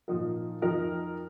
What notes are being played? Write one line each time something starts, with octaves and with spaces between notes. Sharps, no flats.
A#2 F3 D#4 A#4
F2 F3 D#4 A#4